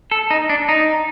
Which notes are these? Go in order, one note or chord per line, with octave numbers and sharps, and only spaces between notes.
A4
D#4
D4
D#4